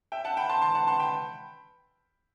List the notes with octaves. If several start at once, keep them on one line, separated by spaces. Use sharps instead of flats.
E5 G5
F#5 A5
G5 B5
A5 C6
A5 C6
F#5 A5
A5 C6
G5 B5